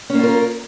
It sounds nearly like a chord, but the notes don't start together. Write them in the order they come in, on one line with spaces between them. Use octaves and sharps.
C#4 A#3 F4 A#4